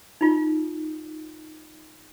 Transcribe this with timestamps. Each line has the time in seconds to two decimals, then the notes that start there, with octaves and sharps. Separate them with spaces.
0.21 D#4 F4